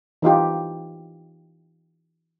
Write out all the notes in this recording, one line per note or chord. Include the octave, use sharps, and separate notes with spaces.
E3 D#4 F4 G4